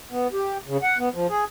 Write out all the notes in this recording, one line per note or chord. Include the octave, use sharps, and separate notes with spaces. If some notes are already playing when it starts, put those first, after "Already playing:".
B3
G4
C#3
F#5
B3
F3
G#4